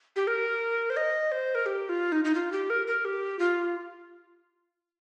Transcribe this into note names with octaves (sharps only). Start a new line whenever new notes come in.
G4
A#4
C5
D#5
C5
A#4
G4
F4
D#4
D#4
F4
G4
A#4
A#4
G4
F4